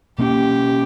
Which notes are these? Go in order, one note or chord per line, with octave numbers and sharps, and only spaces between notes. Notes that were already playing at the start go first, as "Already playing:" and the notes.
B2 A#3 C#4 G4